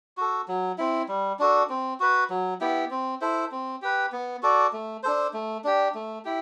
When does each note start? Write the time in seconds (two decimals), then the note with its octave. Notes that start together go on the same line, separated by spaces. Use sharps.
0.17 F#4 A4
0.48 F#3
0.78 C4 E4
1.08 G3
1.39 D4 F#4 A4
1.69 C4
2.00 F#4 B4
2.30 F#3
2.61 B3 E4 G4
2.91 C4
3.21 E4 A4 C5
3.52 C4
3.82 G4 B4
4.12 B3
4.43 F#4 A4 D5
4.73 A3
5.03 D4 A4 C5
5.33 A3
5.64 D4 G4
5.94 A3
6.25 E4 G4